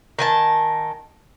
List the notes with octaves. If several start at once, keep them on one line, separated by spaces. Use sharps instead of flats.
D#3 G#5 A5